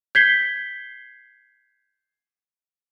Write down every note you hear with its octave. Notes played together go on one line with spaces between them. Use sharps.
G6 G#6 B6 C7 G7